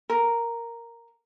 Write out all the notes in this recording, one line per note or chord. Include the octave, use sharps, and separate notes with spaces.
A#4